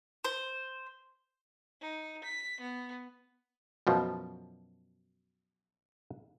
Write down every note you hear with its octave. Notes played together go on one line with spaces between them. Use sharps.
C5
D#4
B6
B3
F#2 B2 F3